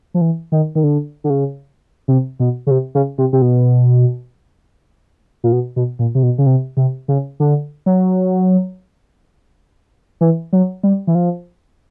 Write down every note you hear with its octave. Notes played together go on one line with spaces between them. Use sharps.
F3
E3
D#3
D#3
D3
D3
C#3
C3
B2
C#3
C3
C#3
C3
C3
B2
A#2
B2
B2
A#2
C3
B2
C#3
C3
C3
C#3
D3
F#3
E3
F#3
G3
E3
F3